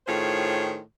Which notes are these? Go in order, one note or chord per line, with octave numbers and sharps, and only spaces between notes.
A2 D#3 F4 G#4 C5 C#5